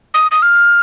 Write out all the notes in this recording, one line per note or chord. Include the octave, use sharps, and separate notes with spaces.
D#6
D#6
F6